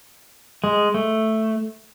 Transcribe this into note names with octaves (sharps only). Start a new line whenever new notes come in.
G#3
A3